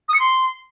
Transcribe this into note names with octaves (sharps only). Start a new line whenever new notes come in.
D#6
C#7
C6